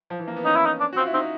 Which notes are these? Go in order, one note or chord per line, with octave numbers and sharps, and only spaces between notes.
F3
E3
A#3
B3
C#4 D#4
E4
D#4
D4
F#4
C4
F4
E4
C4 D#4